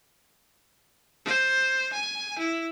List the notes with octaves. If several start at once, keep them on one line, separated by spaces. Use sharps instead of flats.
C5
G#5
E4